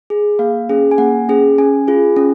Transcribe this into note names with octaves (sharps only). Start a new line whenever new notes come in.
G#4
A#3 F5
C#4 G#4
G#5
A#3 F#5
C#4 G#4
C#4 G#5
F4 G#4
C#4